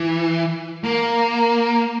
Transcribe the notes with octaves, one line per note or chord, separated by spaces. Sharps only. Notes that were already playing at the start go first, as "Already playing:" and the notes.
Already playing: E3
A#3